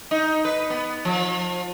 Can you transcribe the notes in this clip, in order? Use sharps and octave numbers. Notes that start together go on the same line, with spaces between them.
D#4
B4
B3
F3